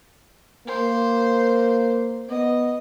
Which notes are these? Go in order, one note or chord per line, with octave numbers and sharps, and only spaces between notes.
A#3 C5
B3 D#5